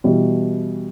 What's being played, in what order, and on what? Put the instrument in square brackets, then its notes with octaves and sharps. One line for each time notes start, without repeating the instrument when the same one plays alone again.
[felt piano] B2 E3 G3